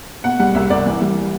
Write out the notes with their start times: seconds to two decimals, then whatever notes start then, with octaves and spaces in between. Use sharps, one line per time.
0.24 B2 F#5
0.39 G3 F#5
0.55 C2 E5
0.70 C2 D5
0.86 E3
1.01 G3